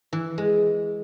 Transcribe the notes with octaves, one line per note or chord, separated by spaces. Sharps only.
E3
G#3